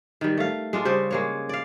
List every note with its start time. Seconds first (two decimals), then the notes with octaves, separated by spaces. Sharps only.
0.21 D#3 G3
0.37 A3 F5
0.73 G#3 D4 F4
0.85 C#3 G3 C5
1.11 G#3 A#3 C#5
1.49 D5 F5